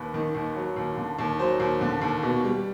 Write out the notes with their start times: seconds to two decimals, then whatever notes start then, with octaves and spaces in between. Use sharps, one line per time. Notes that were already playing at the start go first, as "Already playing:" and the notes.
Already playing: D#2 B4
0.14 D#3
0.35 D#2
0.56 F#3
0.76 D#2
0.97 D3
1.19 D#2
1.39 F#3 C5
1.60 D#2
1.81 D3
2.02 D#2
2.23 B2
2.44 G3